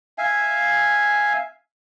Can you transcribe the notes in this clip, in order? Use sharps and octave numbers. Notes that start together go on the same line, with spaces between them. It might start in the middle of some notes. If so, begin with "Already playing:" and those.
E5 F5 G#5